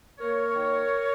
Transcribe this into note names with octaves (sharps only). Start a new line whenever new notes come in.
A#3 A#4 C#5
D#3